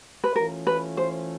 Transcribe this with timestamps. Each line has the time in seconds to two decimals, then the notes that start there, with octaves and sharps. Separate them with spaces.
0.24 B4
0.35 E3 A3 C#4 F4 A#4
0.67 B4
0.97 C5